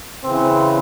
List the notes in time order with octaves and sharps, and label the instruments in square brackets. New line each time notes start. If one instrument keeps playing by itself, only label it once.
[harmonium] C#3 E3 [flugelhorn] C4